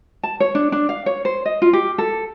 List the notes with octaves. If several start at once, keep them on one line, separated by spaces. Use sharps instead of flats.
A5
C#5
D4
D4
F5
C#5
C5
D#5
F4
G4
A4